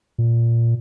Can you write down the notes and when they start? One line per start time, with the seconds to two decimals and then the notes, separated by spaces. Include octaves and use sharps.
0.18 A#2